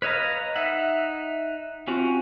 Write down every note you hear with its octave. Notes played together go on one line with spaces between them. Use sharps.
B4 C#5 D#5 F5 A#5
D#4 E5 F#5
C4 C#4 F4 F#4